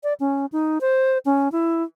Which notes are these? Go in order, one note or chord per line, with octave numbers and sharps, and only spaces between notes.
D5
C#4
D#4
C5
C#4
E4